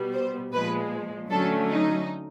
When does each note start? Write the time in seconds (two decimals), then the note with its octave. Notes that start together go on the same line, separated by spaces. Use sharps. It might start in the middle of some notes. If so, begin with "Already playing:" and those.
Already playing: B2 G3 B3
0.13 C5
0.52 A#2 F3 G#3 B4
1.30 D3 F#3 A3 C#4 A4
1.70 D#4